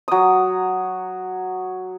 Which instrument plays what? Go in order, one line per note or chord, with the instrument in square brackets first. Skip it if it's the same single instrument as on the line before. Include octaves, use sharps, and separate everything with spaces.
[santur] F#3 D#6